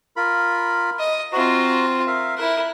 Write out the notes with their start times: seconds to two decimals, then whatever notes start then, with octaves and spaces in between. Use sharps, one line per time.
0.17 F4 A#4 B5
0.99 D#5
1.33 C4 F4 F#4 A#5
2.07 A#4 E5 F5
2.38 E4 A#4 F#6